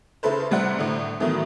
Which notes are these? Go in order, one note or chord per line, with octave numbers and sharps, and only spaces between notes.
C#3 E4 A4 B4 C5
A1 C3 G3 E4 C5 F#5
A2 D3
A2 D#3 E3 F#3 A3 B3